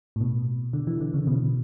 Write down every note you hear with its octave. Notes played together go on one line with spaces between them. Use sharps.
A2
B2
D3
E3
D3
C#3
B2